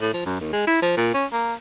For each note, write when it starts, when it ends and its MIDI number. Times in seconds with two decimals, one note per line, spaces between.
0.01 0.13 45
0.14 0.25 53
0.26 0.39 42
0.41 0.53 39
0.53 0.66 56
0.67 0.80 64
0.82 0.97 53
0.97 1.10 46
1.14 1.25 61
1.32 1.54 58